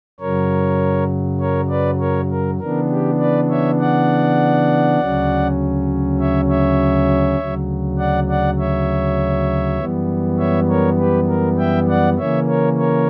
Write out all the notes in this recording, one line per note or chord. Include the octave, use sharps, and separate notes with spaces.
F#2 C#3 F#3 A#4 C#5
A#4 C#5
B4 D5
A#4 C#5
A#4
C#3 E3 B3 D4 A#4
G4
B4 D5
C#5 E5
D5 F#5
D2 C#3 F#3 C#4
C#5 E5
C#5 E5
D2 C#3 F#3
D5 F#5
D5 F#5
C#5 E5
F#2 E3 G3 B3
C#5 E5
A#4 C#5
G4 B4
A#4
E5 G5
D5 F#5
C#3 E3 A#3 C#4 C#5 E5
A#4 C#5
A#4 C#5